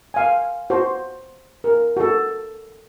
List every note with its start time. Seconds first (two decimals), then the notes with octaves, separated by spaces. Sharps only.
0.14 F5 G#5
0.70 F#4 C5
1.64 A#4
1.97 F#4 A4